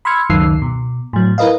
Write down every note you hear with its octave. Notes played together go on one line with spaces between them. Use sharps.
B5 C6 E6 F6 G#6 C#7
C#2 F#2 D#3 E6 C7
B2
A2 F#3
E4 A#4 B4 D#5 F5